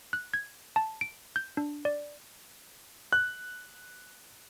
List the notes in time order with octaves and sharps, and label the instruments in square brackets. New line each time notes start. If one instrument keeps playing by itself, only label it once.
[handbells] F#6
G#6
A5
D7
G6
D4
D5
[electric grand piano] F#6